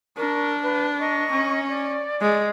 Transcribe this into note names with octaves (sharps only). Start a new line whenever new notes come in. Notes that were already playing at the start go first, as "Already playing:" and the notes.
D4 A#4 C#6
B4 F5
D#5 A#5 C#6
C#4
D5
G#3